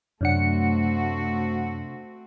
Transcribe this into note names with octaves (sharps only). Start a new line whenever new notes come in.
F#2 C3 A3 C4 D4 F#4 F#5 C#7